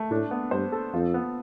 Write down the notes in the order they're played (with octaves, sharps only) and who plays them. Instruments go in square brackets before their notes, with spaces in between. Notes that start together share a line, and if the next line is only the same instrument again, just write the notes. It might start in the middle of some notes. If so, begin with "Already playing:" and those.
Already playing: [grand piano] A3
[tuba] A2 [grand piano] D4
[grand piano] B3
[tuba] G2 [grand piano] C5
[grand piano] A4
[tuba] F2 [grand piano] F4
[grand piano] B3